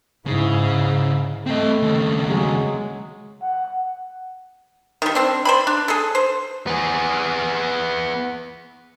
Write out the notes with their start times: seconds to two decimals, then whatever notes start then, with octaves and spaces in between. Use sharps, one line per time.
0.27 G#2 C#3 E4
1.46 A3 C4 D#5
1.82 D#2 C#3
2.25 F#3 G#3
3.42 F#5
5.02 D#3 G3
5.15 C4 D4
5.45 C5 D5 B5
5.67 D4
5.88 G#4 A4
6.15 C5
6.67 B3 G#4